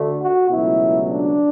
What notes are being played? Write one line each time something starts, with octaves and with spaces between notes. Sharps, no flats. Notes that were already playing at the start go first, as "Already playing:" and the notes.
Already playing: D2 D3 A3
F#4
C#2 B2 F#3 A3 E4
D4